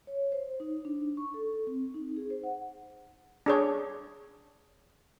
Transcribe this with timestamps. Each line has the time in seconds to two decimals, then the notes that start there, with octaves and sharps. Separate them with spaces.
0.07 C#5
0.32 C5
0.60 D#4
0.85 D4
1.17 C#6
1.34 A4
1.67 C4
1.94 D#4
2.16 G#4
2.30 C5
2.43 F#5
3.46 D4 G#4 C#5